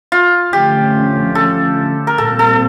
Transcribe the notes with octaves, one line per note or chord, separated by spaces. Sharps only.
F4
D3 F3 A3 C#4 G4
A4
A#4
A#2 G3 C4 A4
A4